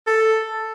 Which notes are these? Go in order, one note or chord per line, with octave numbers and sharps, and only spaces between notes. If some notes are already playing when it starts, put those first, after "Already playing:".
A4